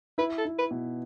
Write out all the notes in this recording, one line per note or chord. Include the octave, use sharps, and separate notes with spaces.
E4 B4
A4
E4
B4
B2